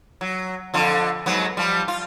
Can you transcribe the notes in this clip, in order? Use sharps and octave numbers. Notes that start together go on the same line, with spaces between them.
F#3
F2 D3 F4
G#2 F#3 B3
F3 G3
F4